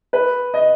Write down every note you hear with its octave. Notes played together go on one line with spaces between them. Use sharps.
B4
D#5